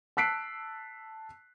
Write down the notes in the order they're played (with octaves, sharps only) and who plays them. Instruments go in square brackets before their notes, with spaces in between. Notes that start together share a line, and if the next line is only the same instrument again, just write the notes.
[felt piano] A5 E6 F#6 B6 C7 D7